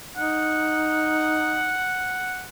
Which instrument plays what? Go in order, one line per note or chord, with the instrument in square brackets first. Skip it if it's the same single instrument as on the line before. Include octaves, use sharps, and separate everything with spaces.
[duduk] D#4 [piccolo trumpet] F#5